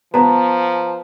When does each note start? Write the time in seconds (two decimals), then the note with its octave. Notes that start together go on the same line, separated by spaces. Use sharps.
0.14 F3 B3 A5 A#5